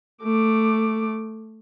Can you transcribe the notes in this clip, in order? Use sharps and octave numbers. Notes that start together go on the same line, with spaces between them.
A3 D6